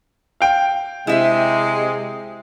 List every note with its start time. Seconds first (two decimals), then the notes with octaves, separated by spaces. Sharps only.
0.41 F5 G5
1.07 C3 G#3 E4 E5